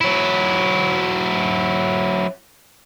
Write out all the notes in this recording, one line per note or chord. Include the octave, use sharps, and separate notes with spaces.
F#3 E4